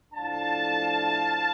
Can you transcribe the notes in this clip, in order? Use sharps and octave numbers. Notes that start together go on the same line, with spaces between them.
A2 F3 A3 D4 F5 A5